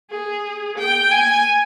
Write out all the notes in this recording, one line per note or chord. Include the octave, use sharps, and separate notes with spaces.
G#4
G5
G#5